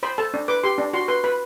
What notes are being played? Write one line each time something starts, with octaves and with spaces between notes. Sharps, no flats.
C5 B5
A4 A5
D4
B4 D6
G4 C6
D4
F#4 C6
B4 C6
B4 B5